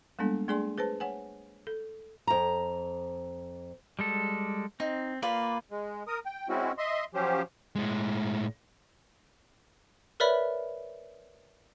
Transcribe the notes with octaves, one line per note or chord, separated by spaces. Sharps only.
G3 G#3 A#3 B3 D4 A4
A3 D4 G#4 D5 G#5 C6
G#4 B4 C5 A5
C#5 F#5 G#5
A4
F2 A#5
G3 G#3 A4
C4 D#4
A#3 F4 B4 D5
G#3
A#4 D#6
G5
G#3 C4 C#4 E4 F#4
D#5 E5 C6
F3 F#3 C#4 G4 C5
A2 G#3
A#4 B4 C#5 D5 E5 B5